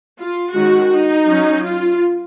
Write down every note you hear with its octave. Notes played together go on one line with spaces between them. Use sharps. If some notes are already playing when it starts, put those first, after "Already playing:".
F4
D#3 G#3 C#4 F#4
D#4
F#3 C#4
F4